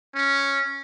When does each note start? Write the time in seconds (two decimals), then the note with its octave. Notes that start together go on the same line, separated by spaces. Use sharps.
0.15 C#4